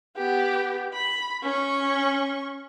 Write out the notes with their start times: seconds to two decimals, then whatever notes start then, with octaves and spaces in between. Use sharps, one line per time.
0.17 B3 G4
0.93 B5
1.43 C#4 C#6